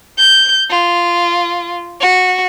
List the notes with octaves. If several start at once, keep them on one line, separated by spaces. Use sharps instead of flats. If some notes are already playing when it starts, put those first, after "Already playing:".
G6
F4
F#4